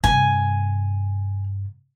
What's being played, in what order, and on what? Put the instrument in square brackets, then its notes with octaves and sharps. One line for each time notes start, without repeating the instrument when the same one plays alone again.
[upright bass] G2 C3 [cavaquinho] G#5